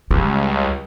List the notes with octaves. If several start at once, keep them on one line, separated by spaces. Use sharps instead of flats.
C#2 G3